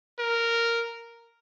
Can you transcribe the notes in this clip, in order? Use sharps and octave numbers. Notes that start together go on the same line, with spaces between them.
A#4